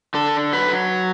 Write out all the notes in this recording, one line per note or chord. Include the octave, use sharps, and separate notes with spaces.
D3 A4
F#3 B4